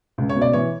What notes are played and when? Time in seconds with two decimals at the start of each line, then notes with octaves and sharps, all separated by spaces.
0.18 C#2
0.29 C#5
0.36 B2
0.42 D5
0.53 E3 C#5